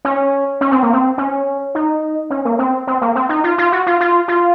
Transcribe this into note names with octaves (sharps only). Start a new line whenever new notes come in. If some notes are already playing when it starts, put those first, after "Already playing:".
C#4
C#4
C4
A#3
C4
C#4
D#4
C#4
A#3
C4
C4
A#3
C4
D#4
F4
F4
F#4
F4
F4
F4